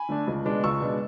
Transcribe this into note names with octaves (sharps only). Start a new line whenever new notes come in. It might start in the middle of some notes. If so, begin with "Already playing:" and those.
Already playing: G#5 B5
D3 A3 D4
C#2
B2 G#3 D4
C#2 C#6 E6
B2 G#3 D4